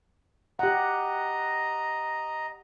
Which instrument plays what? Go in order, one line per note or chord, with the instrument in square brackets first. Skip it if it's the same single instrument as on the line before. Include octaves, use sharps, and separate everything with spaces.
[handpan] G4 F#5 [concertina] D#5 A#5